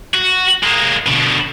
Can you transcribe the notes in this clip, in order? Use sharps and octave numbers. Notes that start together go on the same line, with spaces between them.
F#4
G#3 A#3
B2 D3